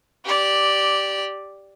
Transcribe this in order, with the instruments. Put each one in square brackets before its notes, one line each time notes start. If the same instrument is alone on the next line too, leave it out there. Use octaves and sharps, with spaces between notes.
[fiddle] G4 D5